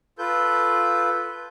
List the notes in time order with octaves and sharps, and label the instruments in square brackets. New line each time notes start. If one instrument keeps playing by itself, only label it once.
[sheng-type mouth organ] F4 A4 B4 G6